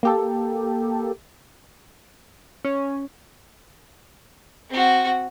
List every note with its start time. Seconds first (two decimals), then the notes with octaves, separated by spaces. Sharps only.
0.03 A#3 G4 A4
2.65 C#4
4.70 C4 F#4